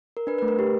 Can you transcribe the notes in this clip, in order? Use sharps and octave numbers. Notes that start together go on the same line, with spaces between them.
A#4
D4 B4
A3 B4
A#4
G4